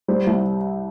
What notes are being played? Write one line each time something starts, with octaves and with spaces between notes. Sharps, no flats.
G3 C5
C2